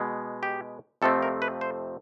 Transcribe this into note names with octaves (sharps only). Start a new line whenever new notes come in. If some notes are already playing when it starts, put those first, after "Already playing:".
Already playing: B2 G#3 B3
G4
F2 C3 F3 A3 C4 A4
A#4
B4
C5